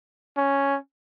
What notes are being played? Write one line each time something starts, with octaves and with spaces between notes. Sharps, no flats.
C#4